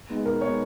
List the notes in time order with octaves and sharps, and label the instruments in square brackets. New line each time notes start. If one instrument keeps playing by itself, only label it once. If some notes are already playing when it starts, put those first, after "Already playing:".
[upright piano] G#3 B3 D#4
B2 A#4
G#3 B3 D#4 C#5